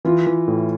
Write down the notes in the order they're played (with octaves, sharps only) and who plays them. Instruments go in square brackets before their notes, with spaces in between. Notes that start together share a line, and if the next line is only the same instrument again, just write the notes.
[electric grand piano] E3 [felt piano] F4
[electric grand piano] E3
A2